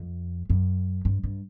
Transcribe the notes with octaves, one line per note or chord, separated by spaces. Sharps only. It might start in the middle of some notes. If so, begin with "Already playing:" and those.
Already playing: F2
F#2
G2
G2